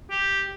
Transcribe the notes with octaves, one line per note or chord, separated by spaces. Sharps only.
G4